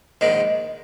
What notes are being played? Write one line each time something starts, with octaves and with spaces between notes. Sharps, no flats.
A#1 G#2 D#3 G#3